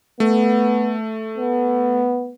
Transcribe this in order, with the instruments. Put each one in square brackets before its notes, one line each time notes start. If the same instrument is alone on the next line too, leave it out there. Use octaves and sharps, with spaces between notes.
[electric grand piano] A3 [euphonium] B3
[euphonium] B3